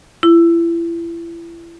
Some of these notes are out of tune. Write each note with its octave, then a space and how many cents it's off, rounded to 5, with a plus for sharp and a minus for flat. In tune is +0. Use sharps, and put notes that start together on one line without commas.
E4 +35